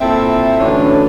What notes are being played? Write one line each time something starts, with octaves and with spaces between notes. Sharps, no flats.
A#2 C4 E4 A4 E5
A2 D3 E3 F#3 C#4 D4